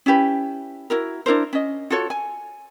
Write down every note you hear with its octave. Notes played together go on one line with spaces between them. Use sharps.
C#4 E4 G4 B4
E4 F#4 A#4
D4 E4 A#4 C5
C#4 D#5
F4 F#4 A4 C#5
G#5